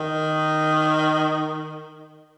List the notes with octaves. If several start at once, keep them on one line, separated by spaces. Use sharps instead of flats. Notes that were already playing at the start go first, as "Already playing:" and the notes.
Already playing: D#3